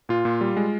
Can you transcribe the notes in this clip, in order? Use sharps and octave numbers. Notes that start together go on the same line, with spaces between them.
A#2 F4
A#2
G3
G#3